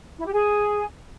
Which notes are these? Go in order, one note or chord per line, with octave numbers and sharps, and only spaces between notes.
E4
G4
G#4